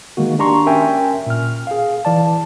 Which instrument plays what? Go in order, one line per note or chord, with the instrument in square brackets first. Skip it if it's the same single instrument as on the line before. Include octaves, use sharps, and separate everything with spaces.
[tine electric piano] D#3 G#3 A#3 F#4
D4 G4 A#5 C6 C#6
C#4 A#4 E5 G5 G#5
A#2 F6
G#4 F5
E3 D5 A5